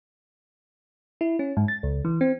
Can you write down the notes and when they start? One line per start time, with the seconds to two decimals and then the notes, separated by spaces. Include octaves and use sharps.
1.21 E4
1.39 C#4
1.57 G#2
1.68 A6
1.83 C#2
2.05 E3
2.21 C4